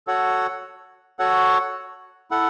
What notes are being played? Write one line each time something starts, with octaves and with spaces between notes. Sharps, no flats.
F#4 A4 C#5 F#5
F#4 A4 C#5 F#5
E4 A4 F#5